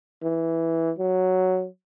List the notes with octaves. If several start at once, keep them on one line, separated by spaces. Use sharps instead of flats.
E3
F#3